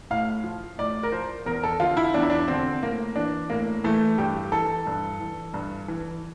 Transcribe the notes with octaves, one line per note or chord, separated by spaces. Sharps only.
A2 F5
F3
A2 D5
A#4
F3 C5
E2 A#4
A4
D3 F3 F4
E4
E2 D4
E4
D4
D3 F3 C4
A2 A#3
E3 D4
A2 A#3
E3 A3
G2 G4
E3 A4
G2
E3
G2
E3